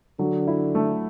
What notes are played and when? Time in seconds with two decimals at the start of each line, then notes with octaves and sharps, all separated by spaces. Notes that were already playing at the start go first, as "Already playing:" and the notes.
0.19 D3 F#3
0.47 E4
0.75 A3